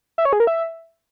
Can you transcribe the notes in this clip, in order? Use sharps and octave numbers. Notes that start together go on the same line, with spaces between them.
E5
C#5
G#4
A#4
E5